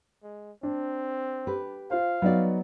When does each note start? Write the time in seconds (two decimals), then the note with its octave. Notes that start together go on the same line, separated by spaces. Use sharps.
0.23 G#3
0.63 C4 D4
1.47 G4 B4
1.91 F4 C5 F5
2.22 F#3 B3 D#4 F#4 D5